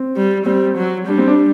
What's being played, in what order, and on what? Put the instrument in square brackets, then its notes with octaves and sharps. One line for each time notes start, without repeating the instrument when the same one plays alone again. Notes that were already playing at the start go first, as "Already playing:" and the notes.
Already playing: [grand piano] C4
[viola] G3
[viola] G3 [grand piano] C4
[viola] F#3
[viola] G3 [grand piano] D4
[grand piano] C4
D4